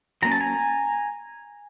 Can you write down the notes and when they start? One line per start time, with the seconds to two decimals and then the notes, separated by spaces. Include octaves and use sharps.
0.22 F#3 A#3 C#4 A#5
0.32 A5
0.41 G#5 A#5